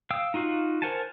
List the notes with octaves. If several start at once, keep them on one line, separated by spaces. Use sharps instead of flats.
F5 G5 D#6 E6
D#4 F4 F#4 F5
A#4 C5 F#5 G#5 A5